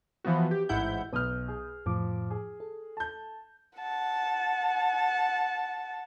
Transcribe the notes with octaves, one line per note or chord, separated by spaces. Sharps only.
E3 F3 B3 F#4
G4
A1 G#2 E4 F#5 G6
B1 B4 D#6 F6 G6
G#4
F2 A2 F3 D6
G#4
A4
A5 G6
F#5 A5